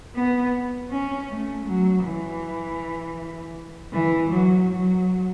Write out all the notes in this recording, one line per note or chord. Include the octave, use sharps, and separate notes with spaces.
B3
C#4
A3
F#3
E3
E3
F#3
F#3